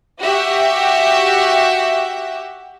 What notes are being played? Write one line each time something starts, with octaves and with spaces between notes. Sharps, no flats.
F#4 G4 E5